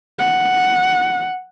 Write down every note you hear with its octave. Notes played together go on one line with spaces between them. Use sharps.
F#5